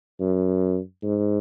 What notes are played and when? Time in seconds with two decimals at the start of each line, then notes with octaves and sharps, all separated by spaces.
0.20 F#2
1.03 G#2